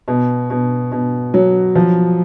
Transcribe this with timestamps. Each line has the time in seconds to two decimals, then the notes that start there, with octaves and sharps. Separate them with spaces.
0.08 B2
0.50 B2
0.92 B2
1.34 F#3
1.75 F3